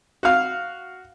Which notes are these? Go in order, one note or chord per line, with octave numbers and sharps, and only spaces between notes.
F#4 F5